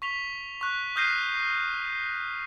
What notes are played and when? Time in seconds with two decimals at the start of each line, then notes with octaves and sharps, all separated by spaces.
0.02 C#6 B6 F7 G7
0.61 C#6 F#6
0.96 D#6 F6 G6 A#6 C7 D#7